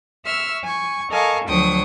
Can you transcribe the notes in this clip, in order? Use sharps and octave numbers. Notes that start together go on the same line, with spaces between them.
E5 C#6 E6 F6
G#5 C#6
A4 A#4 D#5 F5 G#5 C#6
D2 F3 F#3 G5 C#6 D#6